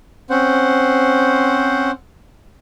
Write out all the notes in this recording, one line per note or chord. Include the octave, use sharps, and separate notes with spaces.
C4 C#4 C5 F#5